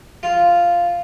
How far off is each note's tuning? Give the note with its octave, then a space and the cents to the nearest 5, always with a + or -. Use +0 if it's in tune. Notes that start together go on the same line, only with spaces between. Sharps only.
F4 -5